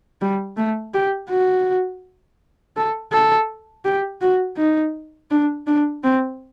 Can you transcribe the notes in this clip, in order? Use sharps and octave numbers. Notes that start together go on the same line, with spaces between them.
G3
A3
G4
F#4
A4
A4
G4
F#4
D#4
D4
D4
C4